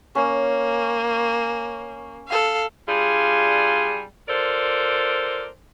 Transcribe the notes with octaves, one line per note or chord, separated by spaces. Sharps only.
A#3 C#4
A4 F5
G3 D4 F4 G#4
F4 A4 A#4 C5 D5